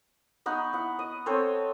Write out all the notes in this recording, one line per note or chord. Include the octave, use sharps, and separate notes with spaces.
B3 D#4 F#5 C#6
E4 F#5
D#5
C4 A4 C5 C#5